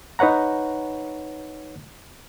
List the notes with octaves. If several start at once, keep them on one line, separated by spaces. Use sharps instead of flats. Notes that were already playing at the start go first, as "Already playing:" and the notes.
D#4 B4 C#5 F#5 A#5